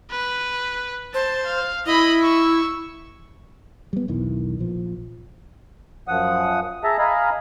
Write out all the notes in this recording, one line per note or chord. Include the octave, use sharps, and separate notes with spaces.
B4
C5 A5
F5
E4 D#5 B5
C#6 E6
G3 B3
B1 E2 D#3 E3
A#1 F3
F#2 F3 F#5 D#6
G#4 E5 A5 A#5
D#5 F5 G#5 A#5 B5